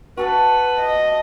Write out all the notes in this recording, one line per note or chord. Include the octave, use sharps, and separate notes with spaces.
F#4 A4 B4 A5
D#5